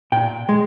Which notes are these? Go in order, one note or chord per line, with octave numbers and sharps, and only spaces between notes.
A#2 G5
G#3